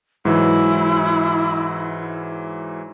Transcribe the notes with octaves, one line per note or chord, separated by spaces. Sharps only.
G#2 E3 F#3 E4